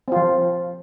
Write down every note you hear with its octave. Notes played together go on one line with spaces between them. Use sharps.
F3 C4 F4